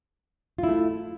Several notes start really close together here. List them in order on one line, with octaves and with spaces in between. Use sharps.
F4 E4 A3